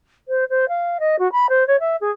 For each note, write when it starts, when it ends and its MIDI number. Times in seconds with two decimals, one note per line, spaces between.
0.28 0.44 72
0.50 0.65 72
0.69 0.98 77
1.00 1.16 75
1.19 1.30 66
1.32 1.47 83
1.49 1.66 72
1.67 1.76 73
1.80 1.96 76
2.01 2.11 68